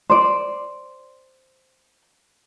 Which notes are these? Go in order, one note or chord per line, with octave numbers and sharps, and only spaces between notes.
C5 D5